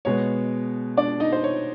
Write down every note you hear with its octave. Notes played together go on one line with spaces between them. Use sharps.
B2 G#3 B3 C#5
D4 D5
D#4 D#5
C5
C#5